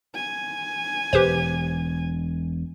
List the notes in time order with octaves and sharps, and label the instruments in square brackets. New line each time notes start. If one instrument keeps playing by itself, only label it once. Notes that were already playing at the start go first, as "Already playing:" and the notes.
[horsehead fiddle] G#5
[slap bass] E1 [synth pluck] G4 B4 C5